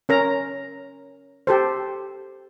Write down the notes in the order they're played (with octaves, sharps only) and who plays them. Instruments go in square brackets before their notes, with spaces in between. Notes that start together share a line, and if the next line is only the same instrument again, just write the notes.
[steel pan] C#4 A#4 A#5
G4 A4 C5